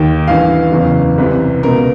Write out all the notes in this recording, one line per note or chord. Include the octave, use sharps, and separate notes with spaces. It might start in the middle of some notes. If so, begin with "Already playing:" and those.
Already playing: D#2 D#3 G5
A1 G2 E3 F5
F#1 E2 C#3 E3
C2 C3 E3 B4
C#2 B2 A#4